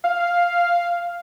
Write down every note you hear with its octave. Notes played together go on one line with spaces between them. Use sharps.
F5